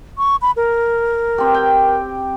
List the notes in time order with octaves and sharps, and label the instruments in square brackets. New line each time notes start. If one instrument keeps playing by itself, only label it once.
[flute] C#6
B5
A#4
[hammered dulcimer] C4 G4
G5